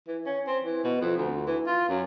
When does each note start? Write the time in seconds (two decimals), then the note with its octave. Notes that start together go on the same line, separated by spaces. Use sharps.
0.08 E3
0.26 C#4
0.47 C4
0.64 E3
0.84 B2
1.01 F2
1.17 D2
1.47 E3
1.67 F4
1.88 F#2